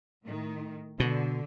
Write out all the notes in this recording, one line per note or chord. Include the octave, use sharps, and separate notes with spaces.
A2 D#3
B2 D3